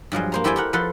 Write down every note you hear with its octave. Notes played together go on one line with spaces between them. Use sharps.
G2 F3 F#3 G#3
A#3 C5 A#5
E4 G4 A4 C5 G5 G#5
G4 A#4 F#5
F3 A4 B4 F#5 C6